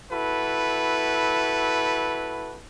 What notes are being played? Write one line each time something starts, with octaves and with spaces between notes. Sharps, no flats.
E4 F#4 A4 B4